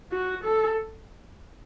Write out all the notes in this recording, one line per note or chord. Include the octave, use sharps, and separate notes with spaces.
F#4
A4